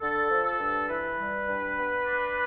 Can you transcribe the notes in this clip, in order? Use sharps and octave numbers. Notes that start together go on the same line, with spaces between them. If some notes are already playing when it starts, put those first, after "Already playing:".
D3 A4
F3
A4
G2
E3 B4
G3
G2
B3
D4